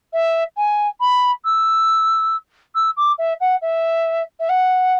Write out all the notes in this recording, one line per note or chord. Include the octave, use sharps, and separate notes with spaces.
E5
G#5
B5
E6
E6
D6
E5
F#5
E5
E5
F#5